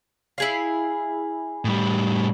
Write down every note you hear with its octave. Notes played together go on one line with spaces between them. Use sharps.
E4 G#4 F5
A2 G3